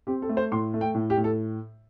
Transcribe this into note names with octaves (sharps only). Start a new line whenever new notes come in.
C4 G4
A4
A3
C5
A2 C6
A3
G5
A2
G4
A2
A4